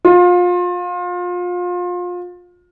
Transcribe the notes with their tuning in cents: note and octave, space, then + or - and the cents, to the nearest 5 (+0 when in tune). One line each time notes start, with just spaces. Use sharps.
F4 +30